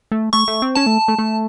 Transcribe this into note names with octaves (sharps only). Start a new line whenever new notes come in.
A3
A3 C#6
A3
C4
C#4 A5
A3
A3
A3